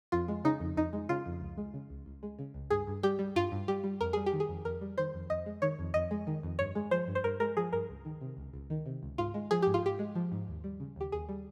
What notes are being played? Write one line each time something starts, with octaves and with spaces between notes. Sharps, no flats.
F2 F4
G#3
C#3 D#4
F2
F2 D#4
G#3
C#3 F4
F2
C#2
G#3
C#3
C#2
C#2
G#3
C#3
C#2
G2 G#4
G2
G3 G4
G3
G2 F4
G2
G3 G4
G3
F2 A#4
G3 G#4
G4
D#3
G#4
F2
F2 A#4
G3
D#3 C5
F2
F2 D#5
G#3
D#3 C#5
F2
F2 D#5
G#3
D#3
F2
G2 C#5
G#3
F3 C5
G2
C5
G2 A#4
G#3 A#4
F3 G#4
G2 A#4
C#2
D#3
C3
C#2
C#2
D#3
C3
C#2
G#2 F4
G#3
F3 G#4
G#2 G4
F4
G#2 G4
G#3
F3
G#2
D#2
G3
C#3
D#2 G4
D#2 G#4
G3